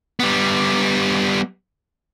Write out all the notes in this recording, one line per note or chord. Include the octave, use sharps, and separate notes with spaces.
G3 B3